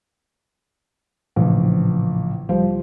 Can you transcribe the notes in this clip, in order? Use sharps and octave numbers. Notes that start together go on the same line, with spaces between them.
A#1 A2 C#3 E3 F3
C#2 F3 G3